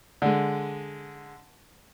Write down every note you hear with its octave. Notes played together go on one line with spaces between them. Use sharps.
D3 G#3